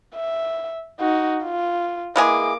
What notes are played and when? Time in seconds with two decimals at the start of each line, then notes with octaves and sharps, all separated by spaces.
0.15 E5
1.00 D#4 F#4
1.43 F4
2.16 E3 G#3 A#3 G#4 D6